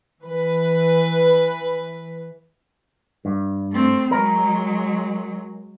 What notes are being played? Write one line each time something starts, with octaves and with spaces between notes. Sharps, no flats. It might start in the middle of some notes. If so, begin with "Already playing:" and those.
E3 B4
G2
A3 C4
F#3 G#3 A#4